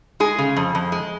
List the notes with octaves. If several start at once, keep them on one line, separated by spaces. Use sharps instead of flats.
G#3 G#4
C#3
F2
F2
G#3